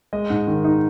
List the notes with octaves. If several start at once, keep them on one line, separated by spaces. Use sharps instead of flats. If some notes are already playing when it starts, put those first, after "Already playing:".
G#3 D#5
G#2
D#3
D#4